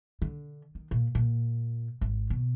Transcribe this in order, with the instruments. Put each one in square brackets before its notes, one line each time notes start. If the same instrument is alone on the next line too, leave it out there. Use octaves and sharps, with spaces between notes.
[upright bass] D3
D#3
A#2
A#2
G#1
B2